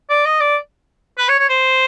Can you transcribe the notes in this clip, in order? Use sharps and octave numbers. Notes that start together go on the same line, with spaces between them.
D5
D#5
D5
B4
C#5
C#5
C5